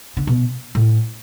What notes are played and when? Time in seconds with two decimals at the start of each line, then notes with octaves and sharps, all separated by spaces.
0.17 D3
0.27 B2
0.75 A2